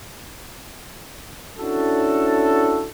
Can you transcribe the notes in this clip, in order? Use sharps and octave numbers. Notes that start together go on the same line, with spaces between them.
C#4 D4 E4 F#4 A4